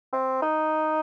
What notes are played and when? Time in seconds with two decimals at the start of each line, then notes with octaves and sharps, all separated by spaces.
0.13 C4
0.42 D#4